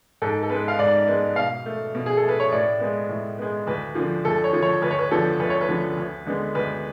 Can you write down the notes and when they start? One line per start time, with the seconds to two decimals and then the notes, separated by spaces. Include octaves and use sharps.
0.22 G#2 A4
0.43 A4
0.49 G#3 B3 B4
0.68 F5
0.79 G#2 D5
1.07 G#3 B3
1.36 B2 F5
1.66 A3
1.95 B2
2.06 G#4
2.17 A4
2.23 A3
2.28 B4
2.40 C#5
2.52 A2 D5
2.80 G#3 B3
3.09 A2
3.39 G#3 B3
3.67 D2 B4
3.95 D3 F3
4.25 D2 A4
4.44 C#5
4.53 D3 F3
4.63 C#5
4.82 D2 B4
4.91 C#5
4.99 B4
5.11 D3 F3 B3 A4
5.40 D2 B4
5.50 C#5
5.61 B4
5.68 D3 F3 B3
5.97 D2
6.26 D3 G#3 B3
6.55 D2 B4